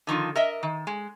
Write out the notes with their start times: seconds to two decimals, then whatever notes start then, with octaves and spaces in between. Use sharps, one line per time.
0.07 D3 D#3 F3 F4
0.35 A#4 D#5 E5
0.63 D#3
0.87 G#3